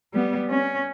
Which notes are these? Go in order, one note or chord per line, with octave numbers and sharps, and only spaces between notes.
G3 B3
C#4